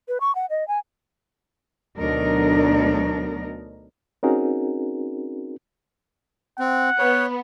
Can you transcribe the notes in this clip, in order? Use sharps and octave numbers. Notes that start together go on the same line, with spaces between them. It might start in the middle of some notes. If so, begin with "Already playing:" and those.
B4
C#6
F#5
D#5
G#5
D2 B2 F#3 D4 D#4 A#4
C4 C#4 D#4 F#4 G#4 A#4
C4 F#5
B3 C#5